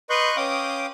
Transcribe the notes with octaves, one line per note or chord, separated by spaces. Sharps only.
B4 D#5 C6 C#6 F#6 G6
C#4 F5 G5 D6 D#6